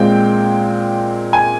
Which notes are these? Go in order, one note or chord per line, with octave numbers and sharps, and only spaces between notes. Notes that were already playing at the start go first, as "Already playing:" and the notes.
Already playing: A#2 G#3 C4 G5
G#5